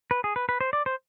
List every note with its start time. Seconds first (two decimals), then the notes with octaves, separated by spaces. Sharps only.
0.11 B4
0.24 G#4
0.36 B4
0.49 B4
0.61 C5
0.73 D5
0.86 C5